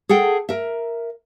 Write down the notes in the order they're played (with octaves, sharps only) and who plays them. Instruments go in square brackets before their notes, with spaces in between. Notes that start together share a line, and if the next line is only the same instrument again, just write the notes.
[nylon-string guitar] G#4 A4 F#5 G5
A#4 E5